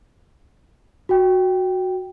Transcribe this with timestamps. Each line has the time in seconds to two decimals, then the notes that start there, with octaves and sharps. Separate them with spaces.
1.09 F#4 G5